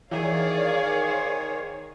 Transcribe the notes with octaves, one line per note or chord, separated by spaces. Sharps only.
D#3 E3 G#4 C#5 D5 F5
C5